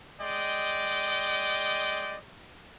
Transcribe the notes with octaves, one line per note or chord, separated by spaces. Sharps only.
G#3 D5 D#5 G5